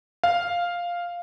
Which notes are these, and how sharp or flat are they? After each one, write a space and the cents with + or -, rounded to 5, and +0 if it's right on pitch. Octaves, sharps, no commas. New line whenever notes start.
F5 +0